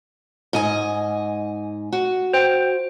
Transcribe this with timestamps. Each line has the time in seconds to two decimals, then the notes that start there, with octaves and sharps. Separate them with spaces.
0.53 G#2 D#5 G#5
1.93 F#4
2.33 C5 G5